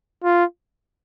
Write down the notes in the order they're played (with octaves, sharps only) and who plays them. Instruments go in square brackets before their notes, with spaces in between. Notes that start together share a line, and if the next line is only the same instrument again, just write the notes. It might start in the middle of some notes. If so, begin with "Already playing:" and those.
[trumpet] F4